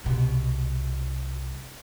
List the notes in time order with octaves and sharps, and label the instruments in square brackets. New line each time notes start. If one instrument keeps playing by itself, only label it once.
[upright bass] C2 B2